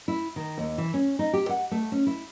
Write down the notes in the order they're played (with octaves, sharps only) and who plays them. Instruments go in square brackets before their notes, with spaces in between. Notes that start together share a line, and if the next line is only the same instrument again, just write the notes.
[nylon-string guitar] E4
D#3
D#2
E3
C#4
D#4
G4
F#5
A3
C#4
E4